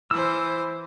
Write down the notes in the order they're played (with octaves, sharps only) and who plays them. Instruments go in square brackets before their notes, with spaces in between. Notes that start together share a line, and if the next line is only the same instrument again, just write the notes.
[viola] E3 C5 [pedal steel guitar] E6